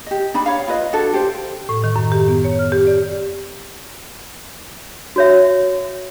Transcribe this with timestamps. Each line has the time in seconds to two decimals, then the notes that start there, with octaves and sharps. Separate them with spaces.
0.06 G4 D#5
0.34 D4 D#4 B5
0.46 C#5 F5
0.68 F4 B4 D#5
0.93 D4 F#4 A4
1.14 G4 C5
1.69 A2
1.84 D#3
1.96 F#2
2.12 G4
2.28 B3
2.44 C#5
2.59 F6
2.72 G4
2.87 D5
5.16 F#4 C#5 E5